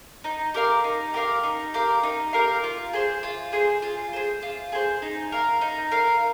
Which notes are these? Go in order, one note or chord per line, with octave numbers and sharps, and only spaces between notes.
D#4
G4 A#4 F5
D#4
G4 A#4 F5
D#4
G4 A#4 F5
D#4
G4 A#4 F5
F4
G#4 C5
F4
G#4 C5
F4
G#4 C5
F4
G#4 C5
D#4
A#4 F5
D#4
A#4 F5